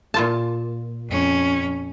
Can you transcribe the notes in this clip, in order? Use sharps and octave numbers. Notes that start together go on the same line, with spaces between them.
A#2 F4 A5
F2 C#4